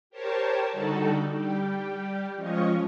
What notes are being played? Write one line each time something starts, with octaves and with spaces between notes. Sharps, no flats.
G4 A#4 C5 C#5 A5
D3 G3 D#4 F#4 A4
G3 G4
F3 G#3 C#4 F4 C#5 D#5